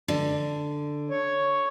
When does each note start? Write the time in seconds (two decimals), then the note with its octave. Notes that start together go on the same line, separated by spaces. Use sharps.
0.08 D3
1.10 C#5